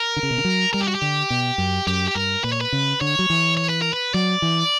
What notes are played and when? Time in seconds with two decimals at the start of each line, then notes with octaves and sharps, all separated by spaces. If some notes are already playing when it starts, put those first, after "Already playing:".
Already playing: A#4
0.16 D3
0.23 C#3
0.31 B2
0.38 C#3
0.45 F#3
0.73 G3 A#4
0.81 G4
0.88 F#4
0.95 G4
1.02 D3
1.30 B2
1.58 F#2
1.87 F#2 G4
2.08 G4
2.15 G2 A#4
2.44 A#2 B4
2.52 C#5
2.61 B4
2.72 C#3
3.01 D3 C#5
3.19 F#3
3.30 E3
3.57 C#5
3.69 B4
3.82 A#4
3.93 B4
4.14 F#3 D5
4.42 E3